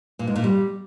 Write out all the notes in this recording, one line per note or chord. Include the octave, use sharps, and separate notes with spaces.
A#2
G#2
A#2
G3